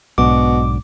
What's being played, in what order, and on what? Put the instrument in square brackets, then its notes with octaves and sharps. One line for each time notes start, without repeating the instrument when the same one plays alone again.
[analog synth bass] B1 [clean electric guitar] G#2 D4 F#4 [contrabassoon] B2 [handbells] D6